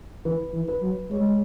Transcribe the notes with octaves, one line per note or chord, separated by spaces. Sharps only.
E3 B4
E3
B4
F#3
G#3 C#5